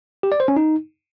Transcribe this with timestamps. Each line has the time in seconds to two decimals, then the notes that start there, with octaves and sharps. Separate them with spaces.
0.23 G4
0.32 D5
0.40 C5
0.48 C#4
0.56 D#4